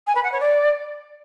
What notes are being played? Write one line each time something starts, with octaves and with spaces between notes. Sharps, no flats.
G#5
B4
F#5
C#5
D5